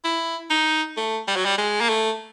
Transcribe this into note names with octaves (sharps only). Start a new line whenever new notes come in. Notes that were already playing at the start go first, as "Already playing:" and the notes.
E4
D#4
A3
G3
F#3
G3
G#3
A#3
A3